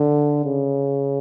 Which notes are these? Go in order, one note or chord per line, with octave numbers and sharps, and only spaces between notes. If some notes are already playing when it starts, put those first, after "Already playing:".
Already playing: D3
C#3